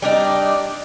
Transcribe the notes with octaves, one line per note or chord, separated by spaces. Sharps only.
G3 D4 D#4 D5